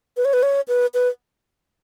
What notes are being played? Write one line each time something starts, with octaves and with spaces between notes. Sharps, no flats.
B4
C#5
B4
C#5
B4
B4